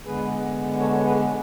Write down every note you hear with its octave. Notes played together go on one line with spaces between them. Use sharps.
D3 G#3 B3 G#4 B4
A4 C#5
G#4 B4